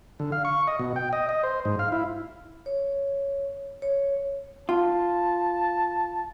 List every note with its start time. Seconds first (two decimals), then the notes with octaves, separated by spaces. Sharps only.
0.20 D3
0.32 F5
0.45 C#6
0.67 D#5
0.79 B2
0.96 G5
1.13 D#5
1.29 D#5
1.43 C5
1.65 G#2
1.79 F5
1.92 E4
2.66 C#5
3.82 C#5
4.69 F4 A5